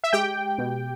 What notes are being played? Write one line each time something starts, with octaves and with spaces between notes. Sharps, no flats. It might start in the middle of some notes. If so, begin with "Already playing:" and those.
E5
G#3 G4 G5
B2